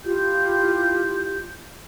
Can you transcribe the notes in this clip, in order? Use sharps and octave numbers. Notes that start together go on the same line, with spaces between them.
E4 F4 G4 G6